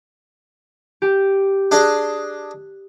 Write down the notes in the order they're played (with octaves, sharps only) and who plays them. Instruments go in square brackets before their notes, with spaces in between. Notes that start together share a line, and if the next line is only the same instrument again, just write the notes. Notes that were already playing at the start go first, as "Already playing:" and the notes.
[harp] G4
[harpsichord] D4 G#4 D#5 [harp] F#6